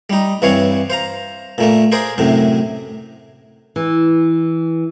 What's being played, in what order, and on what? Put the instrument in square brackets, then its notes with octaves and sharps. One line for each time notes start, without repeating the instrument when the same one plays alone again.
[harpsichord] G3 D#4
G2 E3 C4 C#5 F5
C5 F5 A#5
A#2 A3 A#3
G#4 A#4 C5 D5
F#2 A2 C3
[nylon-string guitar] E3